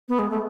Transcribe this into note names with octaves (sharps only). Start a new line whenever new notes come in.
B3
G#3
A3